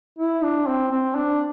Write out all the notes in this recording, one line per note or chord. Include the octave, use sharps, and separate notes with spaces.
E4
D4
C4
C4
D4